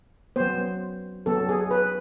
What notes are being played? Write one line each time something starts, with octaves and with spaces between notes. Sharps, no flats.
F#3 B3 C5
F#3 B3 A4
G#4
B4